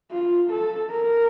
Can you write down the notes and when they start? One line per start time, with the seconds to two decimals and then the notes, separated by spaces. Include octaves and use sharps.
0.12 F4
0.51 A4
0.92 A#4